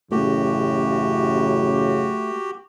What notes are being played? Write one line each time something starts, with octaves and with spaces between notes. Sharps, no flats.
A1 F#2 C#3 A3 F#4 G4